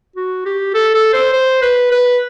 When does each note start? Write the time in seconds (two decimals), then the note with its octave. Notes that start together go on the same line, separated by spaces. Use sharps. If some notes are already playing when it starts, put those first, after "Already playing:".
0.16 F#4
0.45 G4
0.74 A4
0.94 A4
1.13 C5
1.33 C5
1.62 B4
1.91 B4